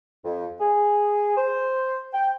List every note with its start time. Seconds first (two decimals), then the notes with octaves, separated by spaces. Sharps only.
0.25 F2
0.60 G#4
1.37 C5
2.13 G5